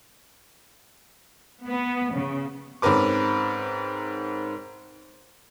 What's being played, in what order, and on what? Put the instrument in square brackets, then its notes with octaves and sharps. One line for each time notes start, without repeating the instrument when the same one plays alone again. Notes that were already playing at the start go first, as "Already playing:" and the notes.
[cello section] B3
C#3
[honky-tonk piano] G#2 C4 C#4 A#4 B4 D6